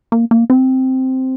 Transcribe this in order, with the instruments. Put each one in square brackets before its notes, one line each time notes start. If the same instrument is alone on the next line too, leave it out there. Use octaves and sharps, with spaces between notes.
[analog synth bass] A#3
A#3
C4